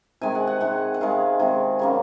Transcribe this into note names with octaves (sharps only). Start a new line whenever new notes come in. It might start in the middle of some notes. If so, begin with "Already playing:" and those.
C3 D#3 G#3 G#5
F#5
F#5
C3 D#3 G#3 F#5
F#5
C3 D#3 G#3 F5
C3 D#3 G#3
C#3 F#3 A#3